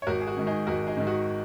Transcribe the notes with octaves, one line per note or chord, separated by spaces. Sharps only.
C#5
G#1 F#4 A#4
G#4
F#4
G#2 D#3
D#4 G#4
G#1 F#4 A#4
D#4 G#4
G#2 D#3
F#4